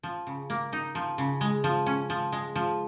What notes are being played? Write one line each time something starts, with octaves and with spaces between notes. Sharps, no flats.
F3
C#3
A#3
D#4
F3
C#3
G#3
F3
C#4
F3
G#3
F3